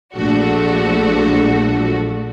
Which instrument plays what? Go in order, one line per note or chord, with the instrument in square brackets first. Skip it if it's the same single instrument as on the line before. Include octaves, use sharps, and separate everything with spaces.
[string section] A#1 F3 A3 D4 F#4